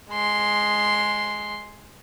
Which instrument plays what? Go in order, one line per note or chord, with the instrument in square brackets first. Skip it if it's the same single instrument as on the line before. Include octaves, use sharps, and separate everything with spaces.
[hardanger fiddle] G#3 C6